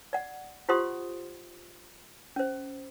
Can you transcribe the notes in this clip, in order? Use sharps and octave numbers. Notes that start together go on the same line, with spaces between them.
D5 F#5
F4 G4 C5 F#5 C6 D#6
C#4 C5